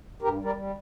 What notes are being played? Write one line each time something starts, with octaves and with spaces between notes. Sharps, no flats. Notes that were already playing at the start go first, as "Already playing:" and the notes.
G2 G4 A#4
G3
A#4 D5
G3